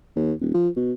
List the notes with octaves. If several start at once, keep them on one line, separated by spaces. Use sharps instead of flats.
D#2
D#1
F3
B2